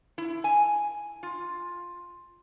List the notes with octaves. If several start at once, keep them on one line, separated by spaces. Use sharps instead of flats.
E4
G#5
F4